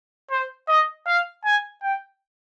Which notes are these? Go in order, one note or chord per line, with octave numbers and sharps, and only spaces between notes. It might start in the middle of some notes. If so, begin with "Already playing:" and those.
C5
D#5
F5
G#5
G5